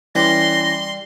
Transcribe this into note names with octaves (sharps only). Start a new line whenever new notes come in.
E3 G3 C#4 G4 C6 D6 A#6